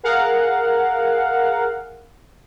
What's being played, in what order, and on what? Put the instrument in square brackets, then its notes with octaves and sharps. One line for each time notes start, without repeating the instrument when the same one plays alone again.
[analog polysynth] G#4 A#4 F5 F#5